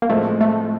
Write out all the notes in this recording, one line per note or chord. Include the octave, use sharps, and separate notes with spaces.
A#3
A2 F3 G#3 A3 C4
A3